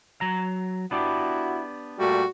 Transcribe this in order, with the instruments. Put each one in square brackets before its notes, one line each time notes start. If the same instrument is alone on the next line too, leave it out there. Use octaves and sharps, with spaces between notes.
[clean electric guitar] F#3 A#5
[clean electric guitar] B3 D4 G4 [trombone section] E4 F#4
[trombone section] A#2 G3 A3 [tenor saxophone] F#4